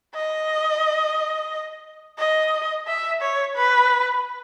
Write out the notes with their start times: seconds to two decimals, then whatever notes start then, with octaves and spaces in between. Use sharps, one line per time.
0.15 D#5
2.19 D#5
2.87 E5
3.21 C#5
3.55 B4